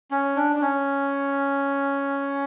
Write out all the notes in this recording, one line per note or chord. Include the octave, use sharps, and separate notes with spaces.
C#4
D4
D4
C#4